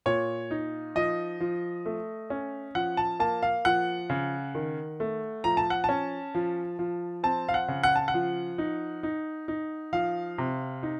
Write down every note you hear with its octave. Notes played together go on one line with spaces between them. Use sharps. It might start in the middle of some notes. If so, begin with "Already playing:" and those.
A#2 C#5
D#4
F3 D#5
F3
A3
C#4
F3 F#5
A5
A#3 A5
F5
F3 F#5
C#3
D#3
A3
F3 A#5
A5
F#5
C#4 A5
F3
F3
C4 A5
F5
F#5
C#3
F#5
A5
F#5
F3
D#4
D#4
D#4
F3 F5
C3
D#4